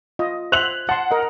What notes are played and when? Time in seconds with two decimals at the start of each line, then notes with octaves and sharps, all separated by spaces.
0.19 F4 D#5
0.52 C5 E5 F#6 F7 F#7
0.89 F#5 A5 C6
1.11 A#4 D#5